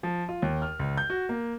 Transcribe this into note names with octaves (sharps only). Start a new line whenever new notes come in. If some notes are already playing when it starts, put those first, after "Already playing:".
F3
F4
D#2
F6
C#2
G6
F#4
A#3